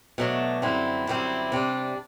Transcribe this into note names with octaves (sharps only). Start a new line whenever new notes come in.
B2 F#3 A3 D4
F#2 D3 G3 C4 E4
F#2 D3 G3 C4 E4
C3 G3 D4